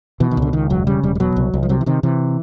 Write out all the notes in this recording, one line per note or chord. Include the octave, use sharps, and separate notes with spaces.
B2 E3
D#3
C#2 D3
C#2 D#3
E1 F#3
C#3 G3
E1 G3
G3
B2 F#3
C2
C2
F3
C3 F#3
E3
C3 D#3
C3 E3